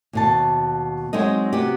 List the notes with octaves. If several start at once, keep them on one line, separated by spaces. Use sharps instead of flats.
D#2 B2 A5
F#3 G#3 C4 D#4 D#5
C3 B3 F#4 G4